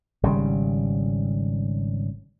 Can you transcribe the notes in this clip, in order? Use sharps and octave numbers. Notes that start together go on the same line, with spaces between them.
G#1 C#3 G3